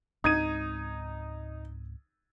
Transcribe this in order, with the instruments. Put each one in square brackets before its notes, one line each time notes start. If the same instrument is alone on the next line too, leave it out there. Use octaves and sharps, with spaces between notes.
[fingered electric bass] C#2 G#2 C4 [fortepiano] D#4 [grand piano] D#6 G#6 D#7